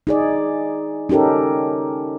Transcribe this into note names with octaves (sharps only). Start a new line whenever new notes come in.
D#4 G#4 D5
C#4 D#4 G4 A4 A#4